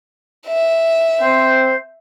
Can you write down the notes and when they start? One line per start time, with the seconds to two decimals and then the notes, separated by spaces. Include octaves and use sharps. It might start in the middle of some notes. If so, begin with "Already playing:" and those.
0.47 E5
1.21 C4 C5